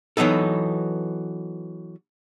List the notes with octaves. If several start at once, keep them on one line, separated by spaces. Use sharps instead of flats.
E3 F#3 B3 D#4 A4